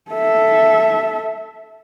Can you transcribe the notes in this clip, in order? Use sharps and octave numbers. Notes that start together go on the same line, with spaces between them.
A4 E5